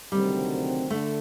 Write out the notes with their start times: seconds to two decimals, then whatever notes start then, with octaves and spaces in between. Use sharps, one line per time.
0.12 D2 C3 D#3 F#3 G3 C4
0.90 D3 A3